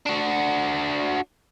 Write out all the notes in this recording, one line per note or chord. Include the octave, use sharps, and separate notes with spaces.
D4 F#4